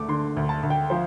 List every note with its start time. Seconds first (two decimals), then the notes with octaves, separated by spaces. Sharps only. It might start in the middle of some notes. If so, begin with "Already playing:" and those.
Already playing: D2 A3 D6
0.08 D3 C6
0.37 D2
0.49 A5
0.63 D2
0.70 G5
0.90 F3 C5